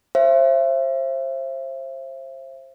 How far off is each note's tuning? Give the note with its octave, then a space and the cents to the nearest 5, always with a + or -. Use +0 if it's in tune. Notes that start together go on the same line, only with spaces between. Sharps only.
C5 +30 E5 +35